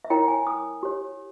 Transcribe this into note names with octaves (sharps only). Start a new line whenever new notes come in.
E5
E4 A#4 C#5 G5
G#5
D#6
G4 C#5